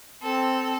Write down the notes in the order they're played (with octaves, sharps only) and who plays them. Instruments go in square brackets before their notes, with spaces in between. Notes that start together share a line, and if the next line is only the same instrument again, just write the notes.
[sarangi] C4 [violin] A4